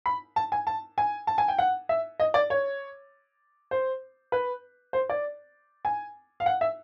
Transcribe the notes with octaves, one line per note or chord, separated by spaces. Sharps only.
B5
A5
G#5
A5
G#5
A5
G#5
G5
F#5
E5
D#5
D5
C#5
C5
B4
C5
D5
G#5
F5
F#5
E5